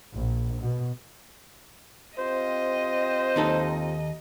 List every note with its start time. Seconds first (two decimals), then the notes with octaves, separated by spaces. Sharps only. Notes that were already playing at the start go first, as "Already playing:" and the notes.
0.13 A#1
0.63 B2
2.19 C4 F4 G4 C5 D#5
3.36 D#2 D#4 A4